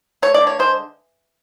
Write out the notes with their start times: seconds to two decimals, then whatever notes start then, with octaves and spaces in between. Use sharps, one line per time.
0.22 A3 C#5
0.34 D5
0.41 D3
0.47 C#5
0.59 G#3 C5